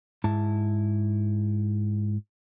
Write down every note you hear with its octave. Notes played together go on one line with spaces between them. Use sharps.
G#2 E4 A5